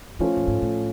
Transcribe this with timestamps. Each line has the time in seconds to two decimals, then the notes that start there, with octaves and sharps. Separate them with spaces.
0.19 E3 F3 A3 C#4 F4 A4
0.36 A2
0.48 G#2
0.62 A2